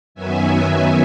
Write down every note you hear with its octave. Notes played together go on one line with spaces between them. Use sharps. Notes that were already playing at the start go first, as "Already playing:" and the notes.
F#2 D#3 F#3 B3 E5 G#5